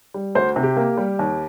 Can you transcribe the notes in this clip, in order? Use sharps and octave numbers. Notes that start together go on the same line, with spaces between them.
G3
D2 C5
C3
G4
A#3
G3
D#2